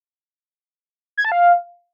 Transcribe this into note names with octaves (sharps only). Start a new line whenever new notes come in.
G#6
A5
F5